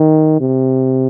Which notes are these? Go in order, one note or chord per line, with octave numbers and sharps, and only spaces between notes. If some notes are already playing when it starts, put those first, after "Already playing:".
Already playing: D#3
C3